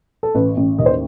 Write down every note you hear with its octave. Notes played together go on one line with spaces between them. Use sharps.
A4
A1 B4
A1
D#2 D#5
C5